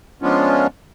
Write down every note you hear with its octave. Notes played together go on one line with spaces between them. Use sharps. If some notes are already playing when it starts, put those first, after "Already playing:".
F3 G#3 B3 C#4 D4 F4